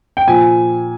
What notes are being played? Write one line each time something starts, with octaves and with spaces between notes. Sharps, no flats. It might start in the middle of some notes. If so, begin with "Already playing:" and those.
G5
A#2 F3 G#5